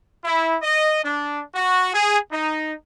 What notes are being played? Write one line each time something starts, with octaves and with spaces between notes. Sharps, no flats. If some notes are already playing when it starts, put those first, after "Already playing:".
E4
D#5
D4
F#4
G#4
D#4